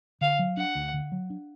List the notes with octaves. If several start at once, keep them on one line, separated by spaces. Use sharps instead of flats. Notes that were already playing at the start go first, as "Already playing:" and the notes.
D3 F5
F#3
D4 F#5
D2
D3
F#3
D4